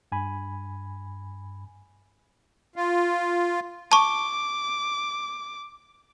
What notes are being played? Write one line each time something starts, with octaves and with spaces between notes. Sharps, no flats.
G2 G#5 B5
F4
A5 C#6 D6